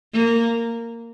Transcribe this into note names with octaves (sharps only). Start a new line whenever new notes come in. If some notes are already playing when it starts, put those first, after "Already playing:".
A#3